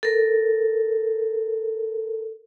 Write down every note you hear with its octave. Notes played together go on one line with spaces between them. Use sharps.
A4 A#4